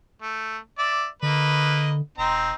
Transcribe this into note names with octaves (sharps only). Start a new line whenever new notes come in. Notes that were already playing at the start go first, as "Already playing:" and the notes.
A3
D5 E5
D3 A#3 B4 D#5
E1 C4 D#4 A#5